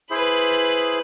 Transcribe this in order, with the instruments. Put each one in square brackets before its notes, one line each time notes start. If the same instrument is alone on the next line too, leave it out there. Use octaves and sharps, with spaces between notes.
[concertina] E4 G#4 C5 [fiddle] B4 B5